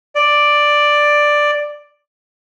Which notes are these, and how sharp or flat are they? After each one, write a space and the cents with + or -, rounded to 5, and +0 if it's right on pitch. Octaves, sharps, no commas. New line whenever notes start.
D5 +5